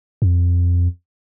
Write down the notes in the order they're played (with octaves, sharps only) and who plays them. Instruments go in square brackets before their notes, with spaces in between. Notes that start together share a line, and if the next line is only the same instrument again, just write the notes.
[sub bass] F2